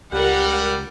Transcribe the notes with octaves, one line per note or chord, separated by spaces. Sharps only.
C#2 G3 G4 A#4 F#5